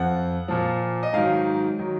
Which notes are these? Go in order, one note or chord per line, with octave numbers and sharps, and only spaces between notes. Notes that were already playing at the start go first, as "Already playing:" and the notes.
Already playing: F2 F3 F#5
A#2 F3
D#5
G#2 D#3 F#3 F5
D#3 F#3